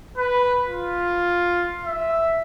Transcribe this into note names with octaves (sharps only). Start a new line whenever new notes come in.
B4
F4
E5